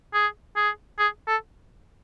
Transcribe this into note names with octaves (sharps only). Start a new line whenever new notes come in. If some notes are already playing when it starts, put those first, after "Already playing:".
G#4
G#4
G#4
A4